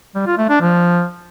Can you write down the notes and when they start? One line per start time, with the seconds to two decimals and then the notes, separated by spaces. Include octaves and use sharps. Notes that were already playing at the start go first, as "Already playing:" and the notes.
0.15 G3
0.26 F4
0.38 A3
0.49 D4
0.60 F3